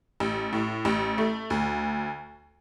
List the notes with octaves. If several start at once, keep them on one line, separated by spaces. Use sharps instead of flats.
A1
A2
A1
A3
D2